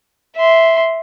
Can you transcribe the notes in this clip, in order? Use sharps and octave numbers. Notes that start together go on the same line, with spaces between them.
E5 C6